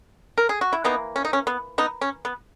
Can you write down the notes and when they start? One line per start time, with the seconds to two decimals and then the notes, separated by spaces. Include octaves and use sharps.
0.38 A#4
0.49 G#4
0.61 F#4
0.73 E4
0.84 E3 A#3 B3 D#4
1.16 C#4
1.25 D#4
1.33 C#4
1.47 B3
1.78 B3 D#4
2.01 C#4
2.25 B3